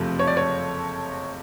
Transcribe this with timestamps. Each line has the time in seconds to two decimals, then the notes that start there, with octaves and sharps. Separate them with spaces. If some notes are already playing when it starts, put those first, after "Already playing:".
Already playing: F#1 F2 C3 F3 A3
0.19 C#5
0.27 D5
0.37 C#5